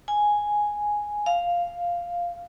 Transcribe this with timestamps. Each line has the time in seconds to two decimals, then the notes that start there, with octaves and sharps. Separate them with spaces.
0.08 G#5
1.26 F5